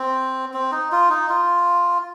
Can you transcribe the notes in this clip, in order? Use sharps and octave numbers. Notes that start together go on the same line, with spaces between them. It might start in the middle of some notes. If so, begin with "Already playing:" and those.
Already playing: C4
C4
D#4
F4
D#4
F4